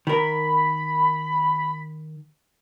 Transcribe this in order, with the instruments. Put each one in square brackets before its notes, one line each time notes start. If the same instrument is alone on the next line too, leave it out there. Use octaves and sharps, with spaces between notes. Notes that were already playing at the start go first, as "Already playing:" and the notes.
[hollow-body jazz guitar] D#3 A#4 [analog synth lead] B5